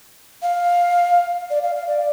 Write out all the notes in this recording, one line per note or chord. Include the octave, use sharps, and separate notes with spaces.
F5
D5
F5
F5
D5